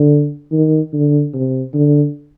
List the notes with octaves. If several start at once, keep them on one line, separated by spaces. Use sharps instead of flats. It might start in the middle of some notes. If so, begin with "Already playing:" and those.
Already playing: D3
D#3
D3
C3
D3